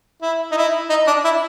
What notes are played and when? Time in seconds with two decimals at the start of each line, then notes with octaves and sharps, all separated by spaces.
0.22 E4
0.52 D#4
0.57 E4
0.90 D#4
1.07 D4
1.24 E4